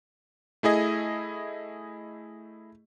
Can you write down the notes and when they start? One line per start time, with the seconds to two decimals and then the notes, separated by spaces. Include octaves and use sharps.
0.63 A3 E4 G#4 D#5